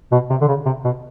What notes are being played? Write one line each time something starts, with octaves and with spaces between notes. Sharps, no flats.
B2
C3
D3
C#3
C3
B2